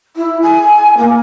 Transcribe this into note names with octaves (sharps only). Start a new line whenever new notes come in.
E4
G#5
A#3